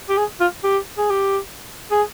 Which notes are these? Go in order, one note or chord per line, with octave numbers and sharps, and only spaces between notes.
G4
G#4
F4
G4
G#4
G4
G#4